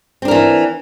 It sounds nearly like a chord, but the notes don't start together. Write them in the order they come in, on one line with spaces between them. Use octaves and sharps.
C4 D4 A#4 E3